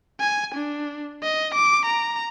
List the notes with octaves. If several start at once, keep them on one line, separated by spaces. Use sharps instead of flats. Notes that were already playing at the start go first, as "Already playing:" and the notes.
G#5
D4
D#5
D6
A#5